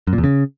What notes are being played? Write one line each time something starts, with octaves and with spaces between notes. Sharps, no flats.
F#2
A#2
E2
C#3